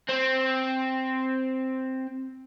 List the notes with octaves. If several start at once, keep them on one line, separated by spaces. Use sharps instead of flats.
C4